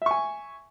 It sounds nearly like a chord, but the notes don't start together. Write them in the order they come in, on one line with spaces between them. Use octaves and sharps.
E5 C#6 G#5